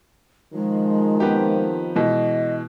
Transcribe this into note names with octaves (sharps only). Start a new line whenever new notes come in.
D#3 F3 G#3
B3 C4 G4
B2 E3 G#3 D#5